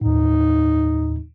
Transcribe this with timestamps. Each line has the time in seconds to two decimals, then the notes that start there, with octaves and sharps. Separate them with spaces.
0.01 D#2 A2 D#4